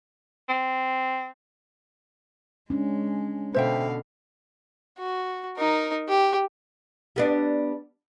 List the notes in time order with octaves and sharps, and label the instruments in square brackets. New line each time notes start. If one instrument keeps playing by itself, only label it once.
[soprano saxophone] C4
[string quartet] G#3 [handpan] C#4 D4
[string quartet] B2 D3 F5 [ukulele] C5 E5 G5
[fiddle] F#4
D#4 A#4
G4
[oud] G3 B3 D4